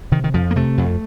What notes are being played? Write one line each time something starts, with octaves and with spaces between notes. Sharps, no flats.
C3 D#3
D#3
F2 F3
A#3
C3 A3
F2